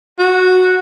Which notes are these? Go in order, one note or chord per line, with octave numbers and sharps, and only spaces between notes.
F#4